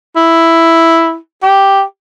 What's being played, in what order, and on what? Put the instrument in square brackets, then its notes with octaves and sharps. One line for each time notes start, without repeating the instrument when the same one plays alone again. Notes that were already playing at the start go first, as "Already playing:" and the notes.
[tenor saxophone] E4
G4